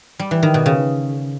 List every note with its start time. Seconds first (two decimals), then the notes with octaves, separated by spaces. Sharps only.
0.19 G3
0.31 E3
0.43 D#3
0.54 B2
0.66 C#3